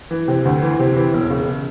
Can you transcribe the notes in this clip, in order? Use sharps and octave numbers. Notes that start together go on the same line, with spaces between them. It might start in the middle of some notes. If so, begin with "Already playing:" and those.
E3
C3
D2
E3
C3
E3
E1
C#3